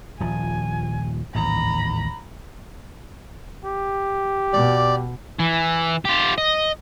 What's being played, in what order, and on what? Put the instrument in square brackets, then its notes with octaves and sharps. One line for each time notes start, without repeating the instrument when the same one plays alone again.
[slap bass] D#1 F3 [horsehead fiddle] G#5
[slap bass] A1 D#2 G#2 [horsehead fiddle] A#5 B5
[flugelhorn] G4
[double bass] B2 [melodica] D5
[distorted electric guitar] E3
F4 G4
D#5